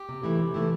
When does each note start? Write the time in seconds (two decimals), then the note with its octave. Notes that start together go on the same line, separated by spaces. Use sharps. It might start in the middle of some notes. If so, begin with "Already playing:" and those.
Already playing: G4
0.09 C3
0.23 E3 A3 E4
0.39 C3
0.54 E3 A3 E4